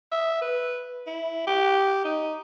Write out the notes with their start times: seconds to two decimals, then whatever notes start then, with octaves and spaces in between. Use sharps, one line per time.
0.12 E5
0.42 B4
1.07 E4
1.47 G4
2.04 D#4